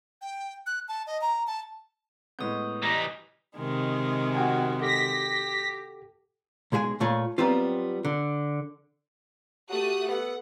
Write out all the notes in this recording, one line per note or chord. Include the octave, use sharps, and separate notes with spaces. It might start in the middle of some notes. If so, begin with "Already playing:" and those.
G5
F#6
A5
D#5
A#5
A5
A2 G#3 B3 D#6 G6
E3 G3 D#5 A#5
C3 D#3 G#3
F#4 G5 G#5
G4 A4 A#6 B6
B1 G#3 G#4 E5 G#5
A#2 A3 F4 C#5 B5
F#3 G3 B3 C4 F4
D3
A3 F#4 G4 D#6 F#6
B3 A4 F#5